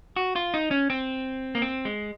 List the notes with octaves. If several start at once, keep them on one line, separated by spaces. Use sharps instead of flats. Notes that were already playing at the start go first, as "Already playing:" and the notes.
F#4
F4
D#4
C#4
C4
A#3
C4
G#3